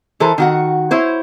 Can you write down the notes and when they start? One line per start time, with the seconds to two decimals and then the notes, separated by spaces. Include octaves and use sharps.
0.20 E3 A4 A#4 C5
0.38 D#3 F#4 F#5
0.91 E4 C5 C#5